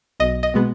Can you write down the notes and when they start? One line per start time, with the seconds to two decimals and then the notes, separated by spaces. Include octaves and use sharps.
0.20 B1 D#5
0.43 D#5
0.54 B2 G#3 B3